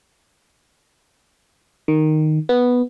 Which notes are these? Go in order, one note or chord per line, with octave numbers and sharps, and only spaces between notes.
D#3
B3